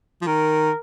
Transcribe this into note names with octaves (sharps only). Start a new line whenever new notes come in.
F3
D#3 A#4